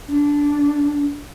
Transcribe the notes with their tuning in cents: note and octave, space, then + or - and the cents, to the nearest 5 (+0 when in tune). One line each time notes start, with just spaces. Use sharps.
D4 -15